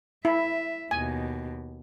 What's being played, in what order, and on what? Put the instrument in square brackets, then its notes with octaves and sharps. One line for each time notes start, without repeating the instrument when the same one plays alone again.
[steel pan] E4 [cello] E5
[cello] D#2 B2 [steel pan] G#5